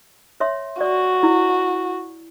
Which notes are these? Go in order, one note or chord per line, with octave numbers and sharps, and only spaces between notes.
C#5 E5 C6
F#4 D5
E4